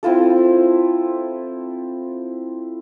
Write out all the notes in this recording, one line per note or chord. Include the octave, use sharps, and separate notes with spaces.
C4 E4 F4 A4